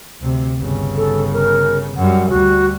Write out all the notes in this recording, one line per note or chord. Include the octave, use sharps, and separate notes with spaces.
D2 C3
G1 C#3
A4
A#4
F#2 G3 F#5
D2 G3 F#4